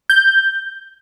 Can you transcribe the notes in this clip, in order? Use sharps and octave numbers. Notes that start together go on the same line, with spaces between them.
G6